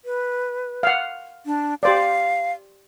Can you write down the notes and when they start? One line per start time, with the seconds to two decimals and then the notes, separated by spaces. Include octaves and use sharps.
0.05 B4
0.83 F5 F#5
1.46 D4
1.83 G4 C5 D5 F5